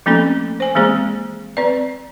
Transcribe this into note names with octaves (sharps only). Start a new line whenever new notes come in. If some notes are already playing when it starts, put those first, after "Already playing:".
F3 A3 A#3 C4 C#4 A4
C5 G#5
E3 G#3 A#3 C4 G#4 C5
C4 B4 D5